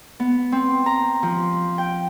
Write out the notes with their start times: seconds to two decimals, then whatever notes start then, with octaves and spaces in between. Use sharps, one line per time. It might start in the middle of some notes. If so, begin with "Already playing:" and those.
0.20 B3
0.52 C4
0.86 A#5
1.23 F3
1.78 G5